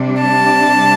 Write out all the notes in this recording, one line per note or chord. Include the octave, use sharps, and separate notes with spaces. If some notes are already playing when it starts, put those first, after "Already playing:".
Already playing: C3 G3 D4
A5